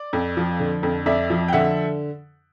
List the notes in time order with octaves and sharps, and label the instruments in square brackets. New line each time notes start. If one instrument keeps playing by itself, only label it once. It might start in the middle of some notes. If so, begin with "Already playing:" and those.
Already playing: [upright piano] D5
F2
F3
D3
F2
F2 D5 E5
F3
G5
D3 E5 F#5